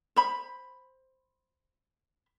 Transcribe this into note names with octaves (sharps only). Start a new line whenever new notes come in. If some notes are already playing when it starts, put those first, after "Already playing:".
C5 B5